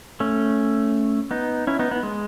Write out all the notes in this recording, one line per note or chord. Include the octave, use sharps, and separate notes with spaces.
A3 C#4
B3 D#4
C#4 E4
B3 D#4
B3
G#3